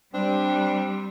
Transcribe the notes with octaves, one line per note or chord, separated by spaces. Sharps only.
G3 C4 D4